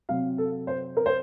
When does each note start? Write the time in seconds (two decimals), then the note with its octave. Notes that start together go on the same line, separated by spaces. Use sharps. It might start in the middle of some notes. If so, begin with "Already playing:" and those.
0.09 C3 F#3 C4 F5
0.38 A4
0.67 C5
0.97 A#4
1.06 C5